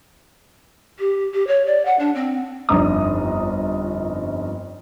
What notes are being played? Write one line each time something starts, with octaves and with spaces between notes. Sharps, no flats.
G4
G4
C#5
D5
F#5
D4
C4
G1 F2 D4 D#4 A#5 D#6